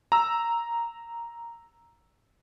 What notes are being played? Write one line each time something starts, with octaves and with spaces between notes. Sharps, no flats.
A#5 E6